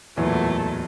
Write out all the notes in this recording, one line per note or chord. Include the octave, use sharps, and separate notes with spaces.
D1 E2 A#2 E3 F#3 A3